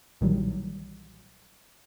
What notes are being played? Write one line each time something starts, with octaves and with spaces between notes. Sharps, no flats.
B1 A#2 D#3 E3 F#3 G3